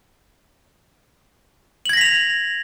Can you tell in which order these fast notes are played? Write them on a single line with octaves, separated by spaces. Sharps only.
F#7 G#6 A#6 B6 F7